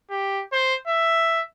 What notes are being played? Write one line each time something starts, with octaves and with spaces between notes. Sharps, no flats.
G4
C5
E5